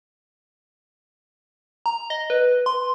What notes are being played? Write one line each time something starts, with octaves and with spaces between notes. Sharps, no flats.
A#5
D#5
B4
C6